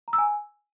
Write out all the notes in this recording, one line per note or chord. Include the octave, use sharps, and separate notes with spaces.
A#5
E6
G#5